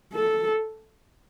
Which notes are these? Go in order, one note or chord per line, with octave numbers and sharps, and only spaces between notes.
A4